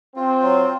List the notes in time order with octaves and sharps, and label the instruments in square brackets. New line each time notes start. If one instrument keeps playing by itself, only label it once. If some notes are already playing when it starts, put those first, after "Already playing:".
[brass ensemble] C4 [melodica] F4
[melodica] F#3